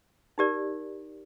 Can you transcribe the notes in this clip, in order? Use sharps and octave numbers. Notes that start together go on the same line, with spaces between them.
D#4 G4 A#4 D5